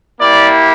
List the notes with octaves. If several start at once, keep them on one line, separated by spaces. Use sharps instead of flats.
A#3 E4 G4 D5